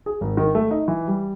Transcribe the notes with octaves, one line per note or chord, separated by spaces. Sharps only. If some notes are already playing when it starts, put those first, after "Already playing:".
G#4
G#1
D#3
A3
D#4
E3
G3